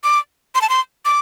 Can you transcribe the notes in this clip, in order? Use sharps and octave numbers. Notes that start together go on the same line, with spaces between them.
D6
C6
A5
C6
D6